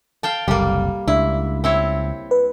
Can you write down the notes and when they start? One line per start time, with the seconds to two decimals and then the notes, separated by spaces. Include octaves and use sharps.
0.23 F5 G5 A5
0.48 F#1 C2 G3 A#3
1.08 C#2 D4 E4
1.64 C4 E4 C#5
2.31 B4